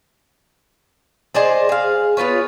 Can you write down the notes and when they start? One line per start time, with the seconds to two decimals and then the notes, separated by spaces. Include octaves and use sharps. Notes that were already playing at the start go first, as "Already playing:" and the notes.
1.34 G#4 C5 D5 D#5
1.69 G#4 F5
2.17 B3 F4 B4 C#5